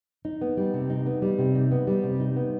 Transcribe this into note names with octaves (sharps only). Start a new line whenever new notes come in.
D#4
B3
G3
C3
D#4
B3
G3
C3
D#4
B3
G3
C3
D#4
B3